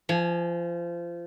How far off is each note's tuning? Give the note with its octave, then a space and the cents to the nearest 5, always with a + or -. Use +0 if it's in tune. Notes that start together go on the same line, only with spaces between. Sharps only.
F3 -25 G#5 +0